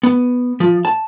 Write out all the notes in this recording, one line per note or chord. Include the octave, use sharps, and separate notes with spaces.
B3
F3
A5